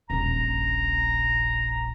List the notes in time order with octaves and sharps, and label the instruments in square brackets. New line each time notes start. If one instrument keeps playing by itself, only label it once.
[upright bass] D#1 A#1 [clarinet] A#5